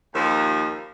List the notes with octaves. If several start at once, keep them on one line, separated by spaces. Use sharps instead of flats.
D#2 F3